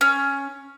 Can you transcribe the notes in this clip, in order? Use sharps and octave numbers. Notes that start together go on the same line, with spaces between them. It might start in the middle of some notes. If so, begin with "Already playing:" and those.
C#4